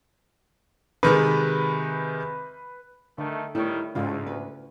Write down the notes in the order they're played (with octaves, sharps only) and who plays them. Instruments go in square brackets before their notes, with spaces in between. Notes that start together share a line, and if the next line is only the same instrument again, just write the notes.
[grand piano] C3 D#3 G#3 [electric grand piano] B4
[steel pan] D3 [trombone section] D#3 A3
[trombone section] D#3 G3 D#4 [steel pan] A3 A4 C#5 [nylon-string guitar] E4
[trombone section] D2 [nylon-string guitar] G#2 [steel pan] C#3 F4
[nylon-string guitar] B4